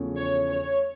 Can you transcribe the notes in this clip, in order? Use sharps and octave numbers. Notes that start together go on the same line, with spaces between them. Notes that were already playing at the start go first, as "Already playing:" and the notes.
Already playing: E2 C#3 F3 A3 C#4
C#5
C#5